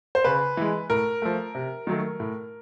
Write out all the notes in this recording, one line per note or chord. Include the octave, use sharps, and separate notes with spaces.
C5
C#3 B4
E3 G#3
A2 A#4
F3 A3
C3
D#3 F#3 A3
A2